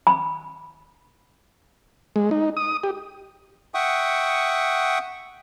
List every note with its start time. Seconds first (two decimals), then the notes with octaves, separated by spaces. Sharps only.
0.07 B5
2.16 G#3
2.31 D#4
2.57 D#6
2.84 G4
3.74 E5 F#5 G5 C#6 D#6